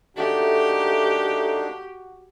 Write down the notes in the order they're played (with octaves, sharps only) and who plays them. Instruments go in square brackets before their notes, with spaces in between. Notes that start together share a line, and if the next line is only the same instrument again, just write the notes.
[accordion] A#3 D4 D#4 [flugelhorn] F#4 [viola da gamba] G4 [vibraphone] A4 E5 F#5